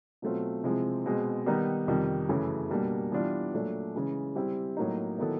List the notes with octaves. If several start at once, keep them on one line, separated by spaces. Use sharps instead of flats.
B2 F#3 A3 C4 F4
C3 F3 G#3 C4 E4
B2 G#3 C4
D#3 G3 B3 D#4
F2 C3 D#3 G3
F#2 C#3 E3 A3
B2 G3 A#3 D4
E3 G3 B3 D4 F4
A#2 F#3 A3 D4
C#3 E3 G#3
G3 C4 E4 G4
A2 F#3 A#3 D#4
D#3 F#3 B3 E4 A4